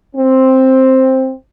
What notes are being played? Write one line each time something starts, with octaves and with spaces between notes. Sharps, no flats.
C4